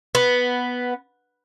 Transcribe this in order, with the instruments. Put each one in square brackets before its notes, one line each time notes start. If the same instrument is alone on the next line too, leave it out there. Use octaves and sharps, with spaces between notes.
[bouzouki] B3